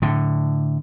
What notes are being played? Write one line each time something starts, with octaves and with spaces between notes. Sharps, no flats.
A2 D3